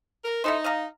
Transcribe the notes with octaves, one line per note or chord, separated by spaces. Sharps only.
A#4
D#4 E4 A4 C5
D#5 F5 A#5